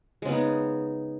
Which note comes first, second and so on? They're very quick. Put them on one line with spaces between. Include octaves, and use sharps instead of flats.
G#3 C#3 B3 D#4